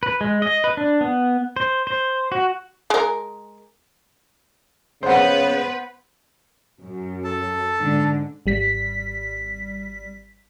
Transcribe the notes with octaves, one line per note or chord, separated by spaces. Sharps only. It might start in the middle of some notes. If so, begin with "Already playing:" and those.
B4
G#3
D#5
B4
D4
B3
C5
C5
F#4
G#3 A#4
C#3 B3 B4 C5 F#5
F#2
A4 A5
G#2 D3
G#1 G3 B6